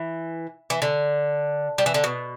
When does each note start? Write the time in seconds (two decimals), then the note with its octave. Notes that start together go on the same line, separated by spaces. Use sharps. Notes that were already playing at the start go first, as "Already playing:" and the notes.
Already playing: E3
0.70 E3
0.82 D3
1.78 G3
1.86 E3
1.94 D3
2.04 B2